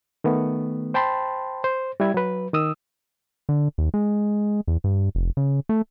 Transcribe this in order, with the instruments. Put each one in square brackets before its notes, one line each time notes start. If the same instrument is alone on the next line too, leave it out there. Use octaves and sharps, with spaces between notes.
[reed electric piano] D#3 A3 B3
C5 G5 A5 B5 C6
C5
G3 E4 G#6
F#3 B4
D#3 D#6 E6
[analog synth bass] D3
D#2
G#3
E2
G2
F1
C#3
A3